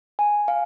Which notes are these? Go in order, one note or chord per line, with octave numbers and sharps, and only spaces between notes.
G#5
F5